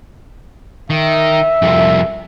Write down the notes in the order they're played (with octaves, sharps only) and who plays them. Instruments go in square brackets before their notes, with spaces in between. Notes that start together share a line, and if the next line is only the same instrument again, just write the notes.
[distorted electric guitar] D#3 [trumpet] E5
[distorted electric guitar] C2 F2